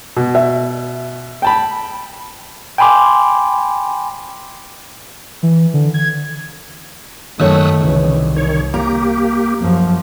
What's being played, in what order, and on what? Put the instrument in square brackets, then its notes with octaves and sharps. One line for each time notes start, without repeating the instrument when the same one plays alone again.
[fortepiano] B2
[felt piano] E5
[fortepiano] G5 A5 B5
[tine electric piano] G5 G#5 B5 C6 D6
[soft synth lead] E3
D3
G#6
[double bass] F#2 A3 [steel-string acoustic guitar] D#3 C#5 [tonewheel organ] D#6 E6 F#6
[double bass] C2 [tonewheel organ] C#3 E3
[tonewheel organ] D#3 C#5
[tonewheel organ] A#3 G4 [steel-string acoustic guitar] A#5
[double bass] F#2 F3